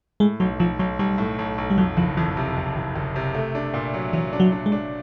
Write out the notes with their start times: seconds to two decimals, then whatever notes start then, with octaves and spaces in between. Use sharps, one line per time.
0.20 A2 G#3
0.40 B1 F#3
0.59 B1 F3
0.79 B1 F#3
0.99 B1 G3
1.18 A2
1.39 B1
1.58 B1
1.70 G3
1.78 F2 F#3
1.97 F#1 F3
2.17 F2 E3
2.37 C3
2.57 F#1
2.76 F#1
2.96 F#1
3.16 C3
3.35 A3
3.55 D4
3.74 A#2
3.94 F#3
4.13 E3 F#3
4.33 D4
4.40 F#3
4.52 D4
4.66 G#3
4.72 D4